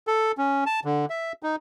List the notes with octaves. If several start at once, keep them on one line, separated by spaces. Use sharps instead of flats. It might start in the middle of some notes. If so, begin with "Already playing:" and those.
A4
C#4
A5
D3
E5
D#4